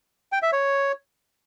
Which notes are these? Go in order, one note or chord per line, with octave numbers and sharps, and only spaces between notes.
G5
E5
C#5